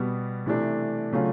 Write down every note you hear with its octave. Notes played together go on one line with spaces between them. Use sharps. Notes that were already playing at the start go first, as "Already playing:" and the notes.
Already playing: B2 G3 B3
C3 E3 A3 D4
C#3 F#3 A3 D4 F4